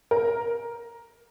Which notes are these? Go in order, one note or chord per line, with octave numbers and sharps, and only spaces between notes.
A#4